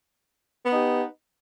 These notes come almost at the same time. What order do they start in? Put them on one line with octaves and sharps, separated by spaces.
B3 D#4 G4